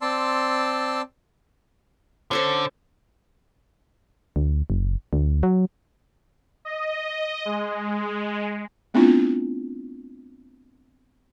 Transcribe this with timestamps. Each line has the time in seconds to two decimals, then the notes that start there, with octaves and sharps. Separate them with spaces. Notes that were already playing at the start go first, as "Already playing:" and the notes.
0.02 C4 D5 A5 C6 E6
2.31 D3 C#4 A4 C5
4.36 D2
4.70 F#1
5.13 D2
5.43 F#3
6.65 D#5
7.45 G#3
8.94 A3 B3 C4 D4 E4 F4